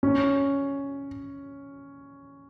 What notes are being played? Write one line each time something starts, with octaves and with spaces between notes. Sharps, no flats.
C#4